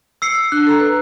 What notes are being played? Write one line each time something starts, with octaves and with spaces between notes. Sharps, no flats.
E6 C7 C#7
D4 F#6
A4 A#5
B4